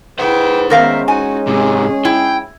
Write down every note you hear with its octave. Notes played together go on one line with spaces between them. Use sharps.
E4 G#4 B4 C5 F#5 G5
D#3 G#3 B3 C#4 A#4 E5 F5
D#4 F#4 G#5
G#2 C3 G#4
E4 G5